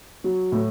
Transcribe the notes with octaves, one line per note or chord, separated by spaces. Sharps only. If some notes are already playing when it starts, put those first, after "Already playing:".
F#3
A2